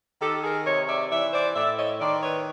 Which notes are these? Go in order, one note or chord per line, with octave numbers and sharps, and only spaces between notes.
D#3 G4 A4
G#4 A#4
C3 C#5 D#5
D5 E5
E3 D5 E5
C5 D5
A2 D5 E5
C#5 D#5
D#3 C5 D5
B4 C#5